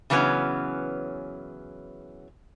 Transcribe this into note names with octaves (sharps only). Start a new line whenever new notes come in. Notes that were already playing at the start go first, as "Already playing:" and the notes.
C#3 E3 F#3 B3 C#4